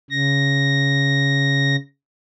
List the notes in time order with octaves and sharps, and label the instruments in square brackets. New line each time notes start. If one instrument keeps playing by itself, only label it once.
[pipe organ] C#3 A#6